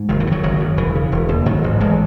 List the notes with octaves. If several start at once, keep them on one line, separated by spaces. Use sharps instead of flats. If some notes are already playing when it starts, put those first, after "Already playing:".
Already playing: G#2
F#1 D#3
E3
C#3
D#3 F#3
F#1 D#3 F#3
F#2
E1 E3
C#3
E1
D#2
G#2 D#3 F#3
A1
A1 E3 G#3